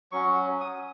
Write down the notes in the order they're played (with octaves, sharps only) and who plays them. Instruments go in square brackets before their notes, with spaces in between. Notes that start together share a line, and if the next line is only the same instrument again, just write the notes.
[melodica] F#3 C#4 F#4 C#6
D#6